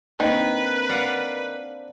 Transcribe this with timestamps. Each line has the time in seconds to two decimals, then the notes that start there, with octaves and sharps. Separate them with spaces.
0.20 D#3 A#3 C4 D4 B4
0.89 D5 F5 F#5